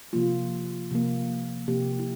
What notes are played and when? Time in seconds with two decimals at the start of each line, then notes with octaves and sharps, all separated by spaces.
0.13 C3 F3 A#3 F4
0.91 C3 F3 A#3
1.68 C3 F3 A#3 G4
1.99 E4